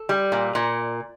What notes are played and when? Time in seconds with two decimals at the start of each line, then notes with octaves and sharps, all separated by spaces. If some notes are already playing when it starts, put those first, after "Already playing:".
Already playing: A4
0.09 G3
0.32 A#2
0.55 A#2